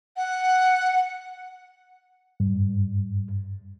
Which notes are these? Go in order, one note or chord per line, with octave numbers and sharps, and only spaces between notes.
F#5
G2